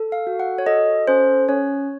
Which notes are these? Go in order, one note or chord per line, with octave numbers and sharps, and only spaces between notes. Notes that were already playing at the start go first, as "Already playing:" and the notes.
Already playing: A4
F5
F#4
F#5
C#5
A4 D#5
C#4 C5
C#4 C#5